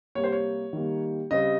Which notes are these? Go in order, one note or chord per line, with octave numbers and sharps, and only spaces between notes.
C3 G3 A#3 C#5
C5
C#5
D#3 G3 A#3
C#3 G3 C4 D#5